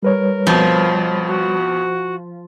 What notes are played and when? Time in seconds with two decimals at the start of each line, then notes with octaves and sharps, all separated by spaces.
0.03 G3 A#4 B4 C#5
0.47 F2 B2 F3
1.27 F#4